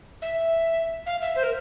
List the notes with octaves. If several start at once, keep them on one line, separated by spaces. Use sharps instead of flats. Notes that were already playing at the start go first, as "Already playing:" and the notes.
E5
F5
E5
C5
A#4